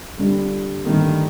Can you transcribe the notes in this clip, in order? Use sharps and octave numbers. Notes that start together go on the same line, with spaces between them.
G1 G2 D3 G3
G2 D3 D#3 A3